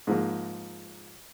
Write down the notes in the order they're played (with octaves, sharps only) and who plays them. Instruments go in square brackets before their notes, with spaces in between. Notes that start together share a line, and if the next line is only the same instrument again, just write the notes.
[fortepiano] G#2 F3 A#3